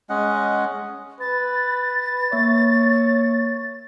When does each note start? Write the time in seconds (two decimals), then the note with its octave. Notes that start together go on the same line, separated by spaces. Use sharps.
0.10 G#3 C#4 D#5 F#5
1.20 B4 A6
2.32 A#3 C#5 E5